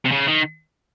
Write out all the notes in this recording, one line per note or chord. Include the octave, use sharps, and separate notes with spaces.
C3
C#3
D#3